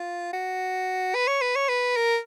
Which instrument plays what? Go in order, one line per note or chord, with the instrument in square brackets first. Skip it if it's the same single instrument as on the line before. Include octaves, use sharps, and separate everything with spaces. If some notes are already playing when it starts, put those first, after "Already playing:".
Already playing: [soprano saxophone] F4
F#4
B4
C#5
B4
C#5
B4
A#4